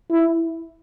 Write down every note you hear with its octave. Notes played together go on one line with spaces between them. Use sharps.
E4